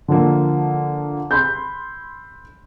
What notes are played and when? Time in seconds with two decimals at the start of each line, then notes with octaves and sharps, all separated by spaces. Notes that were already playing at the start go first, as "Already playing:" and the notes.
0.08 D3 F3 A#3
1.31 B5 C6 G6